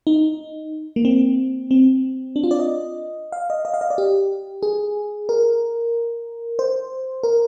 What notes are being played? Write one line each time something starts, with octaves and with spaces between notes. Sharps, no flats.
D#4
A#3
C4
C4
D4
F4
D5
D#5
F5
D#5
D#5
F5
D#5
D5
G4
G#4
A#4
C5
A#4